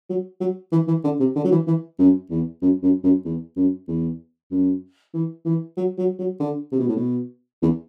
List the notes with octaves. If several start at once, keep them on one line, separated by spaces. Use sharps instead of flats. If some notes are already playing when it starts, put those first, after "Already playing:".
F#3
F#3
E3
E3
D3
C3
D3
F#3
E3
E3
F#2
E2
F#2
F#2
F#2
E2
F#2
E2
F#2
E3
E3
F#3
F#3
F#3
D3
C3
B2
A2
B2
E2